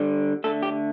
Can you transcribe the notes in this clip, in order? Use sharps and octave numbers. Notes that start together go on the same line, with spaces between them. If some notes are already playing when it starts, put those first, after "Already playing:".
Already playing: D3 G3
D3 A3 A4
G4